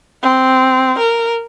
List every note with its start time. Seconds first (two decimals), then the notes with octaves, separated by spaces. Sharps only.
0.22 C4
0.98 A#4